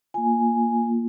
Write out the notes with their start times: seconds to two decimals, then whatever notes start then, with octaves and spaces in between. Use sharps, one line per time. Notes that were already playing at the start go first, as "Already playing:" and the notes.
0.14 A#3 F4 G#5
0.83 A#3 F4